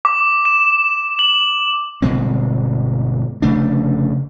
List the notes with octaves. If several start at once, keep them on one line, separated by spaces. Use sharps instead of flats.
D6
E7
F#7
G1 B2 G#3 C4
F1 C#3 A3 D4